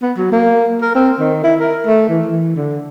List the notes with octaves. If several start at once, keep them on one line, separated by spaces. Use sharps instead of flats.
B3
F#3
A#3
A#4
C4
D#3
E4
A#4
A3
E3
E3
D3